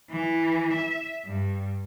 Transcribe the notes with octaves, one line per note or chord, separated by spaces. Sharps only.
E3
E5
G2